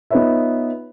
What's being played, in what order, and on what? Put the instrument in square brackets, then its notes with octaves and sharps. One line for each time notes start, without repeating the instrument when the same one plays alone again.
[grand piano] B3 D#4 F4 B4 C#5 E5